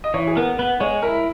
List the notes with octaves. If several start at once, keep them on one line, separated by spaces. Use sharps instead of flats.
D#5
E3 C#5
G#4
B3 A#4
B3 B4
G#3 C#5
E4 A#4